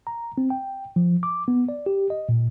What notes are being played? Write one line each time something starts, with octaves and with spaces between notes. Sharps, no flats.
A#5
C4
G5
F3
D6
B3
D5
G4
D#5
A#2